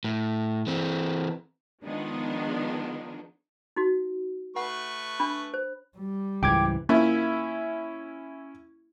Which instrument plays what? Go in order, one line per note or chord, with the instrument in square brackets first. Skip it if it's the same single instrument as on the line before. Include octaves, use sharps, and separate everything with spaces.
[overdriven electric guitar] A2
E3 C4
[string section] D#3 F3 G#3 B3 D4 D#4
[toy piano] D#4 F#4
[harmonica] A3 B4 C#6 [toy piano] F#5
[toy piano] D4 B5
C5
[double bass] G3
[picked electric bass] C#2 G#2 E3 [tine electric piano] G5 D6 G#6
[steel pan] A#3 [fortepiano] C#4 E4 E5